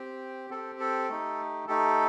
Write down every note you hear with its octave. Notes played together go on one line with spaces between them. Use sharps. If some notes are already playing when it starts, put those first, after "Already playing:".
Already playing: C4 G4
C4 G4 A4
A4
A3 D#4 G4
A3 D#4 G4 A4